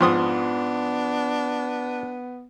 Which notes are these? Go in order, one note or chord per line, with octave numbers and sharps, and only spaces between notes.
F2 G#2 B3 D4 F4 D#6